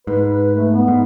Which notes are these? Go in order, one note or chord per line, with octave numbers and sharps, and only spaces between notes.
G#2 B4
B4
A3
B3
G#2